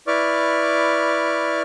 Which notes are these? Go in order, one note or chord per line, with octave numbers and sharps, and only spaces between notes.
E4 B4 D5 C#6 D6 F6